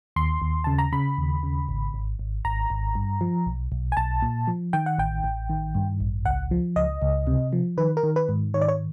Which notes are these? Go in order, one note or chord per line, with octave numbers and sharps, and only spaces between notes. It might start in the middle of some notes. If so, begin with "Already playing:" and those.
D#2 C6
D#2
C#3 A5
A#5
C#3 B5
D#2
C#3
G#1
G#1
G#1
G#1 A#5
G#1
G2
F3
B1
B1
G#5
B1 A5
A#2
F3
D#3 G5
F#5
A1 G5
A1
D#3
G2
A1
C#2 F#5
F3
C#2 D#5
C#2
C3
F3
D#3 B4
A#4
D#3
B4
G#2
D#3 C#5
D5
C#5